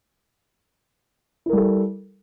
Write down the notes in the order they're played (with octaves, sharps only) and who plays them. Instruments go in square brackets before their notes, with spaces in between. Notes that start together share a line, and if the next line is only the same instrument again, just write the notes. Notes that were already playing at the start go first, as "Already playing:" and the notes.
[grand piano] E4
A#4
G3
A4